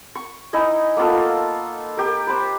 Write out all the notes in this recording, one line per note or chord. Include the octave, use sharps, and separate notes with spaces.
C#6
D#4 E4 D#5 G#5
A#3 B3 F4 A4
G4 A#4
B4 C5